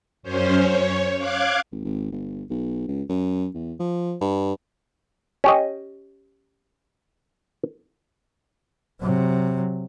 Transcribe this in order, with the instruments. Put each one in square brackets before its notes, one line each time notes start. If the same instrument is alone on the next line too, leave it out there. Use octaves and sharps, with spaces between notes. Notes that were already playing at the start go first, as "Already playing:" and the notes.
[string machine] F#2 C#4 C5
C#5
F5 D6 F#6 G#6
[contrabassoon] G#1
G#1
G1
B1
C#2
F#2
E2
F3
G2
[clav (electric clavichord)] C#4 G4 D#5
[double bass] C3 F#3